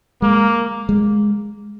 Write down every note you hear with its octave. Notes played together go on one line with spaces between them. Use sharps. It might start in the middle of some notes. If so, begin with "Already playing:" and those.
G#3 A#3
G#3